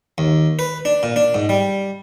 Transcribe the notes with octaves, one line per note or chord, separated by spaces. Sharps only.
D#2
B4
D4
A#2
D4
G#2
G3